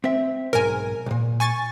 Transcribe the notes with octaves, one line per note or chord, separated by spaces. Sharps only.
C4 E5
B1 G#2 A#4 G#5
B1 A#2
G#5 C#6 A6